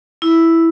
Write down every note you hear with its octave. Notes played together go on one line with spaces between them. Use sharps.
E4